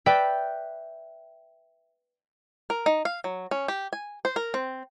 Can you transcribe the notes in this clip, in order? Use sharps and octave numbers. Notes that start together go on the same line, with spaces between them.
B4 D5 E5 G5 G6 B6
A#4
D#4
F5
F#3
C#4
G4
G#5
C5
A#4
C4